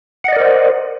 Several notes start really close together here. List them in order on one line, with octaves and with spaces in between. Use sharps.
F#5 D#5 D5 A#4 C5